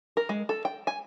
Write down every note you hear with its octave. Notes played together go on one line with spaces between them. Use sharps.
A#4
G#3
A4
G5
G#5